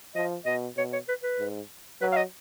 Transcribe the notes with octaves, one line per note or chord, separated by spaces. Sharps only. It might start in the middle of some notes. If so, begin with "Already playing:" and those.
F3 D#5
B2 D#5
B2 C#5
C#5
B4
B4
G#2
F#3 B4
F5
D#5